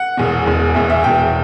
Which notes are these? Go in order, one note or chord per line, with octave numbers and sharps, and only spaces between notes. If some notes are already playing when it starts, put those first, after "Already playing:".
Already playing: F#5
E1 E2 B2
E1 E2 B2
E1 E2 B2 E5
E5
E1 E2 B2 G5
G5